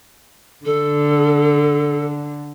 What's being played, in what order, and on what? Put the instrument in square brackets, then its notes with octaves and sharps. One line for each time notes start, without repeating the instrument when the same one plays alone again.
[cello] D3 [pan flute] A4